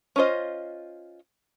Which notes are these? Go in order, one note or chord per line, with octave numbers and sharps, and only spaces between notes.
C#4 F4 C5 D#5